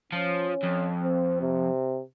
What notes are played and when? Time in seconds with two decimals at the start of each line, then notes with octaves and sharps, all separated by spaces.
0.12 F3 C#4
0.63 F2
1.04 C4
1.41 C3